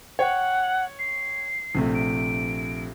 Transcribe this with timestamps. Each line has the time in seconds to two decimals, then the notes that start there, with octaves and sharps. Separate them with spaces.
0.19 C#5 F#5 G5
0.98 C7
1.75 A#1 C3 A3
1.94 D7